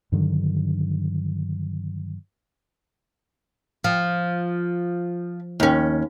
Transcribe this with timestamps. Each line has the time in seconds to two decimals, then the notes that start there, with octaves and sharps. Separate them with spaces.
0.12 G2 D3 D#3 F#3
3.84 F3
5.60 D#2 C#4